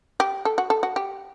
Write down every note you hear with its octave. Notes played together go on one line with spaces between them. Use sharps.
G4
A4
F#4
A4
F#4
G4